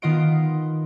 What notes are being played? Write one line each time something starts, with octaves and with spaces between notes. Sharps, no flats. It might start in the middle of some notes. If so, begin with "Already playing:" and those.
D#3 B3 F4 D#5 C6 D7